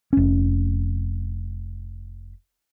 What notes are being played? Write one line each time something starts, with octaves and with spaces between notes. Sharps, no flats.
F1 C#4